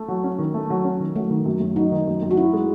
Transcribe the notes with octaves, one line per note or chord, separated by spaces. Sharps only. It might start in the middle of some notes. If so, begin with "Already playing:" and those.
Already playing: A3
F#3
C#4
D#3
A3
F#3
C#4
D#3
F#3 A3
D#3
F#2
F#2
F#3 D#4
D#3
F#2
F#2
F#4
C#4 E4
G#3